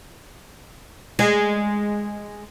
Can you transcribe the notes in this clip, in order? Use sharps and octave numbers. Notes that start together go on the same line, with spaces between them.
G#3